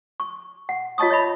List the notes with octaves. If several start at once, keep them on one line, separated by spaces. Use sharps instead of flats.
C#6
F#5
F4 C#5 D#5 A5 C#6 D#6
C#5 D#5 E5 B5